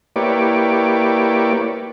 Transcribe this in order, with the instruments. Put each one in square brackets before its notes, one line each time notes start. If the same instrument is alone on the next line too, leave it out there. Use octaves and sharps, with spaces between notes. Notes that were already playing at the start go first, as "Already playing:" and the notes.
[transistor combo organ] A#3 E4 G4 B4 C#5 D5